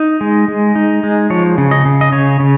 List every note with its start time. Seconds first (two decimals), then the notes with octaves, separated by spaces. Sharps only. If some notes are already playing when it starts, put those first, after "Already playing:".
Already playing: D#4
0.21 G#3
0.48 G#3
0.75 D#4
1.03 G#3
1.30 F3 C#5
1.58 C#3
1.71 D#5
1.85 C#3
2.01 D#5
2.12 C#3 C#5
2.40 C#3